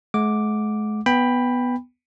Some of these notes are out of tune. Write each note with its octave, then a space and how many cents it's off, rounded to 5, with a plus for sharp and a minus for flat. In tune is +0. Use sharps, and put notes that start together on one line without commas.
G#3 +45 F#5 -20 D6 +0
B3 +0 G5 +20 B5 +0